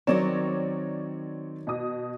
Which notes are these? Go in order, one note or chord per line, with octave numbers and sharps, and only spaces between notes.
D#3 F#3 C4 A#4 C#5 D5 C#6 E7
B2 D#6